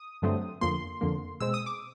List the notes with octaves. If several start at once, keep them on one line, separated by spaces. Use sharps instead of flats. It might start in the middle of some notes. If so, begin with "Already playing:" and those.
Already playing: D#6
G2 D3 F#3 A3 C4
F2 D3 F3 A#3 C6
F2 D3 F3 A#3
B2 G#3 C4 E6
D#6
D6